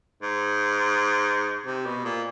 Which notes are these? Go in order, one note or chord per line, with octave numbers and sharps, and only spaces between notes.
G#2
C3
B2
A#2